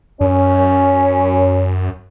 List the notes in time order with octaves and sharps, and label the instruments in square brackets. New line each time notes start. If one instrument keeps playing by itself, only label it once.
[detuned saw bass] F#2 [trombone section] C#4